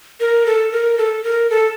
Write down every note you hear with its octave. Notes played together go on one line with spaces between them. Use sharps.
A#4
A4
A#4
A4
A#4
A4